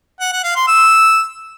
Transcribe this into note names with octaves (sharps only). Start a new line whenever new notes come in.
F#5
F#5
F5
C6
E6